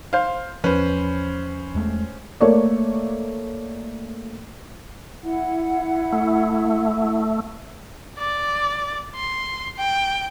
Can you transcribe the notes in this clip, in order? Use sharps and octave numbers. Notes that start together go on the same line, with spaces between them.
C5 F5
E2 F3 C#4 B4 C5
E2 G#3 A3
A3 A#3 A4 C#5 D5
E4 F#5
A3
D5
C6
G5